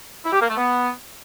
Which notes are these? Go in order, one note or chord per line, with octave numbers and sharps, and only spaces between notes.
E4
G4
A#3
A3
B3